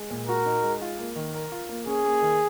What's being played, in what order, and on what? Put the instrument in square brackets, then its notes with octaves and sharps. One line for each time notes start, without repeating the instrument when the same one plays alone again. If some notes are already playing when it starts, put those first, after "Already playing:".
Already playing: [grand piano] G#3
A#2
[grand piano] F#4 [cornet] A#4
[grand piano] D#4
G#3
F4
A#3
D#3
A#4
F4
A#3
[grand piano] C#4 [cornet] G#4
[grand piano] A#3
D#3